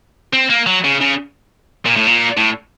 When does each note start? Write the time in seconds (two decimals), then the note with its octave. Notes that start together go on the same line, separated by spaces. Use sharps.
0.33 C4
0.50 A#3
0.67 F#3
0.84 C#3
1.01 C#3
1.86 A#2
1.97 A2
2.07 A#2
2.37 A2